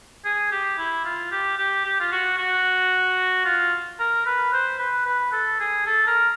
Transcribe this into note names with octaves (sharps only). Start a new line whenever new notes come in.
G#4
G4
E4
F4
G4
G4
G4
F4
F#4
F#4
F4
A#4
B4
C5
B4
B4
A4
G#4
A4
A#4